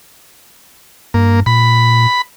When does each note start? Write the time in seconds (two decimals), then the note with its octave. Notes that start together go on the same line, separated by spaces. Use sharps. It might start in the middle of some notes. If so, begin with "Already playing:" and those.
1.14 G2 A#3
1.46 A#2 B5